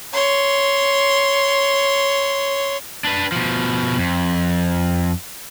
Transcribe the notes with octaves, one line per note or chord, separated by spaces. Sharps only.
C#5 C6
D4 B4
B2 F3
F2